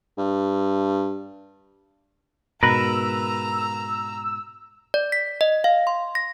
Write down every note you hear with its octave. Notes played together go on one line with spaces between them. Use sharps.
G2
G#2 B2 A#4 B4 A#5 E6
D5
B6
D#5
F5
C6
A#6